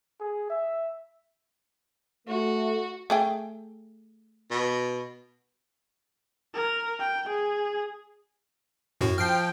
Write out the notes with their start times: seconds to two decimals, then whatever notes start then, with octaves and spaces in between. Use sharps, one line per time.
0.20 G#4
0.50 E5
2.28 A3 F#4
3.10 A3 G#4 G5
4.51 B2
6.54 A#4
6.99 G5
7.29 G#4
9.01 F#2 A2 F#4
9.18 F3 G5 F6 C7